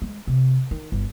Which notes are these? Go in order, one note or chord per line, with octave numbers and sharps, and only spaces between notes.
G#3
C3
D#3
G1